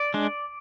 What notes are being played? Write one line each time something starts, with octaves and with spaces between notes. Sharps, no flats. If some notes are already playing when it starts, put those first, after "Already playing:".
Already playing: D5
G#3 D4